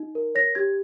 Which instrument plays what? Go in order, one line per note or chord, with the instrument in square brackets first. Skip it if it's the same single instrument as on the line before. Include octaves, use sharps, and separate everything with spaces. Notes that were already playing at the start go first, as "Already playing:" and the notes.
Already playing: [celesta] D#4
A#4
C#5 A#6
G4 G#6